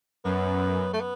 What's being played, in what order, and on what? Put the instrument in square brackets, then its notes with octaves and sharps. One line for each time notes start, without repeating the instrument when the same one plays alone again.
[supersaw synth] F#2 [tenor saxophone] B3
[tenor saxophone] A3
B3